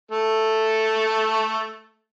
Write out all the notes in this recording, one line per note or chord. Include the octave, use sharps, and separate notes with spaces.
A3 A4